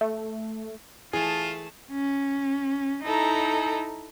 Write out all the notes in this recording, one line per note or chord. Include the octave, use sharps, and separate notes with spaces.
A3
E3 A3 F4 G#4 A5
C#4
D#4 E4 A4 A#5